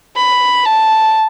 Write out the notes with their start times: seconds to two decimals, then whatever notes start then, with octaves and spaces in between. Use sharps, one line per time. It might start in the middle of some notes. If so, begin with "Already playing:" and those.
0.16 B5
0.65 A5